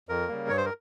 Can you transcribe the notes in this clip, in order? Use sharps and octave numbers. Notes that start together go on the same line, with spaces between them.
F2 A#4
C#3 G3 A#3
G2 C#5
C5
A#4